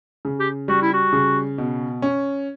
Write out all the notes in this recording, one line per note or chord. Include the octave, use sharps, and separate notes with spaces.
C#3
G4
G3 F#4
E4
F#4
C#3
B2
C#4